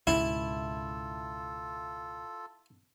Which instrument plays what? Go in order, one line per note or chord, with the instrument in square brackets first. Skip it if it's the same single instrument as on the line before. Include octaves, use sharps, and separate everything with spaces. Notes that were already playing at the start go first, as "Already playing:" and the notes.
[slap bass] C#2 G#2 B2 [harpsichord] E4 [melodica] F4 A4